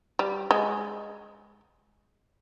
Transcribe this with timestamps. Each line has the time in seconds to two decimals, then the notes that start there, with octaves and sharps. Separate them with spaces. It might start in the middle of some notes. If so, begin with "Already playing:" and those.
0.19 G3
0.51 G#3